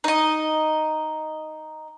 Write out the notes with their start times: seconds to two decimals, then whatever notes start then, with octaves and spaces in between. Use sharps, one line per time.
0.04 D#4 D#5